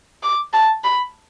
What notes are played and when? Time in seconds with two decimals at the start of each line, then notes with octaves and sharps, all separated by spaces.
0.23 D6
0.53 A5
0.84 B5